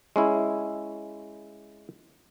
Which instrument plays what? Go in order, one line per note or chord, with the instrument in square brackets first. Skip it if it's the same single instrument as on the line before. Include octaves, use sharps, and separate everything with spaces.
[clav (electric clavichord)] G#3 C#4 E4